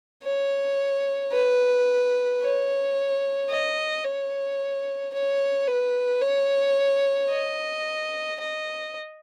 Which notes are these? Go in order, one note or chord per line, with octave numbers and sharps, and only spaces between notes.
C#5
B4
C#5
D#5
C#5
C#5
B4
C#5
D#5
D#5